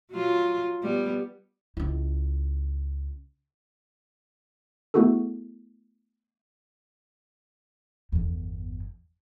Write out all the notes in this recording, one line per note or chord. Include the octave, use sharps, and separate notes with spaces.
F#3 F4
G3 B3
C#2 E4
A3 B3 E4 F#4 G#4 A4
G1 E2